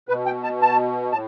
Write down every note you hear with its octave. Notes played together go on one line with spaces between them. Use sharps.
B2 B4
G5
A5
A5
A2 A5